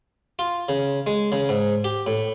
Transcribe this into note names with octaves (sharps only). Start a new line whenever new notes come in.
F4
C#3
G#3
C#3
G#2
G4
A2